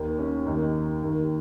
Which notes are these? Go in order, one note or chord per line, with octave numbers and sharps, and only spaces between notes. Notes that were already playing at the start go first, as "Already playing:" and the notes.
Already playing: D#2 D#3
C#4
D#2 D#3 D#4
D#2 D#3